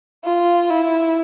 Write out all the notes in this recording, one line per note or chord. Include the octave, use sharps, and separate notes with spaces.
F4
E4